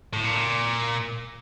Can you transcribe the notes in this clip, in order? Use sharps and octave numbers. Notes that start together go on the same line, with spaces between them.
A2
A#2